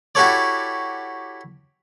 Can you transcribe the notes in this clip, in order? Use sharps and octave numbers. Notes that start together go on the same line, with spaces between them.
E4 F#4 G4 A4 C#5 D5